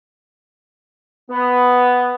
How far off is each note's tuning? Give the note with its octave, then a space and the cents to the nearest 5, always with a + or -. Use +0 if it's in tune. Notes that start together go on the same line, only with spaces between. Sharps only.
B3 +5